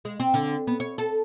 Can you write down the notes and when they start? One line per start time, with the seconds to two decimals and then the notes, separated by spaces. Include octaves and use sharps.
0.05 G#3
0.20 C4
0.34 D3
0.67 B3
0.80 C#5
0.98 A4